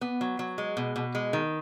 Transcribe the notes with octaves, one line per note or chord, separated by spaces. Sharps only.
B3
F#3
F#3
G#3
B2
B2
G#3
D#3